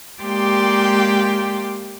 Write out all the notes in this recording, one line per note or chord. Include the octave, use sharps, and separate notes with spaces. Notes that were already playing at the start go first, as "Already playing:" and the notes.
G#3 A#3 G4 D5 G5 C6